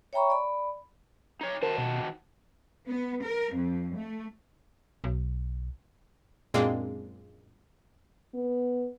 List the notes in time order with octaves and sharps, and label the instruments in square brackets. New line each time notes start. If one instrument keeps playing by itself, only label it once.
[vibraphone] C#5 E5 G5 A#5 B5 C#6
D5 B5
[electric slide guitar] D#4 C#5
[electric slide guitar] D#3 F#4 A5 [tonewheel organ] A#4 C5
[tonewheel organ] B2
[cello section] B3
A#4
F2
A3
[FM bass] B1
[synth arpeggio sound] F#2 A#2 G#3 A#3 C4 D4
[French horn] B3